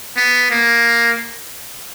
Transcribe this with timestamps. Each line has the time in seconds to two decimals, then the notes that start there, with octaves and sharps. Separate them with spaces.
0.17 B3
0.51 A#3